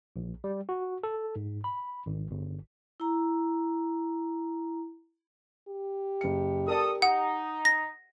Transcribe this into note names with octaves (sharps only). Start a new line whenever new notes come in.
A#1
G3
F#4
A4
G#2
B5
G#1
G1
E4 A#5
G4
F#1 C#7
A4 A#4 D5 A5 D#6
D#4 F#5 D#6
A#6